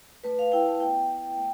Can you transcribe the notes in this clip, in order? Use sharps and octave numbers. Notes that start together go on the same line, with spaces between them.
A3 B4
F5
E4 G5
A5
B3 G5
E4
A3